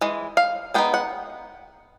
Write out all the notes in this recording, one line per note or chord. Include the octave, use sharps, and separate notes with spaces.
E3 G#3
F5
G#3 B3 D#4 G5
F#5